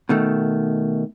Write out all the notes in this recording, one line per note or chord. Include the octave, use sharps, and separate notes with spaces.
B2 D#3 A3